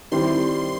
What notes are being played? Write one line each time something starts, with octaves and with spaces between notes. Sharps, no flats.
D#3 G3 C4 E4 C6